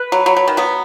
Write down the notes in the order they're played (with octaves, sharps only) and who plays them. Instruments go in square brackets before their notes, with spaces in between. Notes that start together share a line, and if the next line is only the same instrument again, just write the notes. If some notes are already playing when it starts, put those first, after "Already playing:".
Already playing: [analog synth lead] B4
[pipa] F#3
F#3
F#3
D#3
F#3 B3